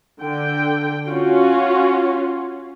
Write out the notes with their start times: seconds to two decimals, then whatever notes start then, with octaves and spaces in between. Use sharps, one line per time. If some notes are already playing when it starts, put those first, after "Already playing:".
0.21 D3 G5
1.08 C#4 F4 F#4